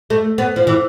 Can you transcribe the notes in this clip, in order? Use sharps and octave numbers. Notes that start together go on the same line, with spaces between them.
A3
B3
F3
E3